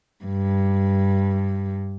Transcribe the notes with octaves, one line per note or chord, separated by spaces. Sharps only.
G2